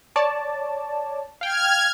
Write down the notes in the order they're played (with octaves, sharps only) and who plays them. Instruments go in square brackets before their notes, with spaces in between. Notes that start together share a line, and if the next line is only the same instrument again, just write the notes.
[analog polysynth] C#5 D5 A5
[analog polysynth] F5 G5 [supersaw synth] F6 G#6